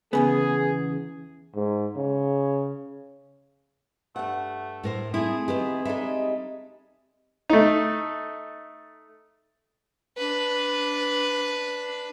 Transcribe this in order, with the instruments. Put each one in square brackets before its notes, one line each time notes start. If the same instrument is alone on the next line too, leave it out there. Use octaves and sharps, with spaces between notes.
[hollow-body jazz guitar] E2 C#3 B3 [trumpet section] G#4
[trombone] G#2
C#3
[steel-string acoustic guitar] G2 F#5 [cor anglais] A3
[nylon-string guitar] A2 A#4 C5
[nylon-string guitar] A3 E4 [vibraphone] C4 [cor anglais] G#4
[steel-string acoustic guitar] D#3 B3 [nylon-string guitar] G4 B4 E5
[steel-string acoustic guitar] G3 G#3 D#4 [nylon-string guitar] A4 E5
[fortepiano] A3 D#4
[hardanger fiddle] D4 B4